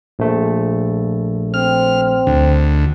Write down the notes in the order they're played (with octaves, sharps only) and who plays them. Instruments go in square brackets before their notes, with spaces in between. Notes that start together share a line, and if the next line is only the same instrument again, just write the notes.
[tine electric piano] A#1 A3
[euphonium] C4 [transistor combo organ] F6
[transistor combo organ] D2